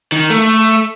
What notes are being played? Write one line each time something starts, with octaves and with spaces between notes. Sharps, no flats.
D#3
A3